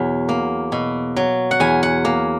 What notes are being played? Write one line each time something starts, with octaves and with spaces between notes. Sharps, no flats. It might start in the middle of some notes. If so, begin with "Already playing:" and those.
Already playing: E2 B2 F#3
A#3
B2
F#3
F#5
E2 G#5
F#5
A#3